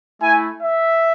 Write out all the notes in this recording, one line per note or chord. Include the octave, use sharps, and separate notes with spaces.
A3 E4 G#5
E5